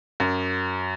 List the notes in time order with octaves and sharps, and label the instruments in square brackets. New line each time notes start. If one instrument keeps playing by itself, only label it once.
[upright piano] F#2